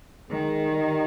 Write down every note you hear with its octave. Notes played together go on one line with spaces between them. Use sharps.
D#3 G#3
G3